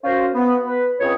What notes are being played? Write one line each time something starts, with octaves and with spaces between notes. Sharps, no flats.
C#4 F4 F#4 A#4 C5
B3
B4
C#2 C4 G#4 C#5